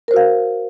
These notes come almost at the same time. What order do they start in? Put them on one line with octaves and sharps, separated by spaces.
A#4 C5 F#4 F5